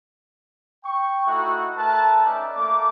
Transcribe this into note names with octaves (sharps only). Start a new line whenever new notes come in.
G5 C#6
A3 D#4 E4 F#4 F#5
A3 A#4 B4 A5
C#4 D#4 D5 E5
A3 A#3 D6